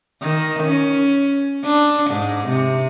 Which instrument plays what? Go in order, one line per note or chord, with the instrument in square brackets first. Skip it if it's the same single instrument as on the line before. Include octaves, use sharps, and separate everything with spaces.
[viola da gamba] D#3
C#4
D4
G#2
C3